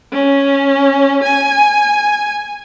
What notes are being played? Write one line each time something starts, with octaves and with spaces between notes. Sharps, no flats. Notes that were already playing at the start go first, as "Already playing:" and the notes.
C#4
G#5